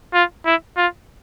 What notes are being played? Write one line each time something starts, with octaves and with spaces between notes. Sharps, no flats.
F4
E4
F4